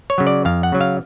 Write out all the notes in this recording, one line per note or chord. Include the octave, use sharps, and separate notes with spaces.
C#5
C#3 F#3
D5
F2 F5
F#5
C#3 F#3
F5